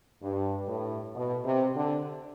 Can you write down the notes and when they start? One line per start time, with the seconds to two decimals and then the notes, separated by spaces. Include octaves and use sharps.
0.23 G2
0.68 A2
1.14 B2
1.44 C3
1.75 D3